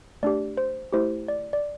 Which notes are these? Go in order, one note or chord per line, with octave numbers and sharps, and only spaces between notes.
A3 D4 G4 D5
C5
A3 E4 G4 C5
D5
D5